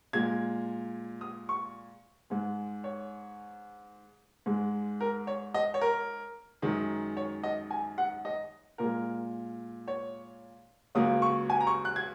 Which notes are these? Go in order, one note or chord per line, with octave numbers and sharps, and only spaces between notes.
A#2 G#3 G#6
D#6
C#6
G#2 G#3
C#5
G#2 G#3
A#4
C#5
D#5
C#5
A#4
F#2 D#3 G#3
C#5
D#5
G#5
F#5
D#5
A#2 G#3 A#4
C#5
C#2 C#3 F#3 A#3 D#6
C#6
G#5
A#5
C#6
F#6
G#6